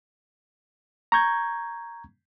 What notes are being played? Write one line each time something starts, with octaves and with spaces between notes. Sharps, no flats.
A#5 C#6 G6 G#6